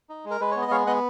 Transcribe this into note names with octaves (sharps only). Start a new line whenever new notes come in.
D#4
G#3
A#4
G#3 B4
B3 C#5
D#5
G#3 C#5 F5
B3 D#5 F#5